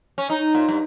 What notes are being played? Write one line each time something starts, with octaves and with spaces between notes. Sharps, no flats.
C#4
D#4
A#2
G2